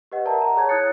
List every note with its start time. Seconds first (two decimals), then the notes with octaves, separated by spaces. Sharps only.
0.12 G4 B4 D#5 F#5
0.26 A#4 D5 E5 F#5 A5 A#5
0.42 F#5 A#5
0.57 G#4 C#5 A5 G#6
0.69 E4 C#5 D#6 F#6 A6 C#7